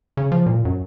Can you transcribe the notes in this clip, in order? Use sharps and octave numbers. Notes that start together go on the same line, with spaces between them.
C#3
F3
A#2
F#2